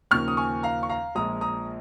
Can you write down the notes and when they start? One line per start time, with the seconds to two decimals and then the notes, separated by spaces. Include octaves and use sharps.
0.11 D#2 C#3 F3 A#3 C#6 F6
0.28 D#6
0.37 G#5 C#6
0.63 F5 A#5
0.83 C#6
0.89 F5 A#5
1.15 A#1 A#2 F3 G#3 A#5 D#6
1.41 A#5 D#6